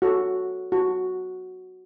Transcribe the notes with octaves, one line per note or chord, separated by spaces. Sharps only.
F#4 A4
F#4